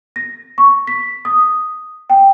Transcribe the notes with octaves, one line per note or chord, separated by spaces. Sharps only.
A#6
C#6
B6
D#6
G5